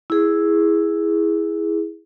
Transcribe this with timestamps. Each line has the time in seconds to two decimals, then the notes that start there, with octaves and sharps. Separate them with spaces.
0.10 E4 G#4